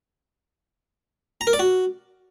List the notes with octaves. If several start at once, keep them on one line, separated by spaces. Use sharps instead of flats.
A#5
A#4
D5
F#4